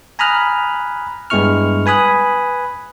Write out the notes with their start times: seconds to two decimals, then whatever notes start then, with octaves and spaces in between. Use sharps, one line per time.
0.19 G#5 A#5 B5 D#6 F6 F#6
1.30 G2 G#3 B3 E4 C#6 F6
1.86 B4 G#5 B5 D#6 F#6